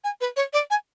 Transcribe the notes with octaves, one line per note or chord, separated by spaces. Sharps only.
G#5
B4
C#5
D5
G#5